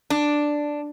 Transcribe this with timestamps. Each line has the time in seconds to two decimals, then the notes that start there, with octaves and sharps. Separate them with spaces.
0.10 D4